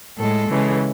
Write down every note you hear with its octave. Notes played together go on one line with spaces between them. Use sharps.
A2 G#3 A4
C#3 E3 G#3